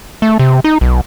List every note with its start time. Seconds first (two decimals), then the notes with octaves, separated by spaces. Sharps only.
0.22 A3
0.39 C3
0.64 D#4
0.81 B1